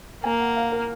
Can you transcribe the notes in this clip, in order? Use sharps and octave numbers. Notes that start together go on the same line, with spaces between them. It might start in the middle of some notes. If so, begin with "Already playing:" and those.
A#3 G#5
F#5
F5
A#4